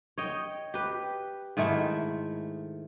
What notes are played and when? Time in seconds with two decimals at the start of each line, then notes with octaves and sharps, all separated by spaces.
0.18 C#5 D#5 G5
0.74 G4 B4
1.57 G#2 D#3 A3 E4